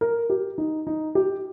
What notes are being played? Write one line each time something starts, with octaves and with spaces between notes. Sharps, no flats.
A#4
G4
D#4
D#4
G4